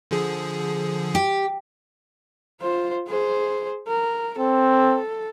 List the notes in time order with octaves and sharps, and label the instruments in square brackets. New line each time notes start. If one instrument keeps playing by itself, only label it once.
[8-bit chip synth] D3 F3 G#4
[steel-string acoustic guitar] G4
[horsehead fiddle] F4 C5
G#4 C5
A#4
[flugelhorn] C4 [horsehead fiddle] A4